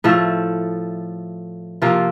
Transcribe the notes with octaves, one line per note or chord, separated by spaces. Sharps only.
A2 F3 A3
C3 F3 A#3 F4